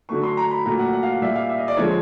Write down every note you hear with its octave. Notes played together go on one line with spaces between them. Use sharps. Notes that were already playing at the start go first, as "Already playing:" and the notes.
D3 F#3 A3 C#6
C6
A#5
B5
A#2 F#3 A3 A#5
F#5
F#5
F5
A#2 G3 E5
F5
E5
D#5
D5
D3 F3 G#3 C#5